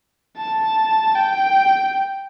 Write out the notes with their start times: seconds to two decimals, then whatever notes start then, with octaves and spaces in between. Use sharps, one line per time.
0.38 A5
1.16 G5